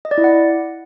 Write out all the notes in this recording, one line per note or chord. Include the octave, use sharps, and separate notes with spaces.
D#5
D5
E4
F#5